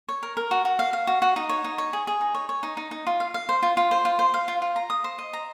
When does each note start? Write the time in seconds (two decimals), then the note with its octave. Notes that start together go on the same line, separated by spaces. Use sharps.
0.09 C#5
0.23 A#4
0.37 A#4
0.51 F#4
0.65 F#4
0.79 F5
0.93 F5
1.07 F#4
1.22 F#4
1.36 D#4
1.49 C#5
1.64 D#4
1.78 C#5
1.93 G#4
2.07 G#4
2.21 D#4
2.35 C#5
2.49 C#5
2.63 D#4
2.77 D#4
2.91 D#4
3.07 F4
3.20 F5
3.34 F5
3.49 C5
3.62 F4
3.77 F4
3.91 C5
4.05 F4
4.19 C5
4.34 F5
4.48 F4
4.62 F4
4.76 A#5
4.90 D#6
5.04 C5
5.18 D#5
5.33 A#5